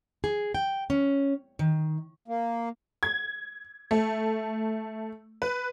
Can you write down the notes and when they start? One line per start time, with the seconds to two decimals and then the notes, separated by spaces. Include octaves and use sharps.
0.24 G#4
0.55 G5
0.90 C#4
1.59 D#3
2.28 A#3
3.03 G#6
3.91 A3
5.42 B4